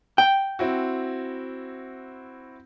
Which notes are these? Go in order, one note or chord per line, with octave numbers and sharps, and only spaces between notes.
G5
C4 E4 F#4